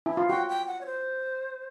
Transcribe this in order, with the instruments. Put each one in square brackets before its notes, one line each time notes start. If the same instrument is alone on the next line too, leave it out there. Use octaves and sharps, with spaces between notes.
[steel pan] E4
F4
[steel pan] F#4 [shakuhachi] G5
[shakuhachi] G5
F#5
C#5
C5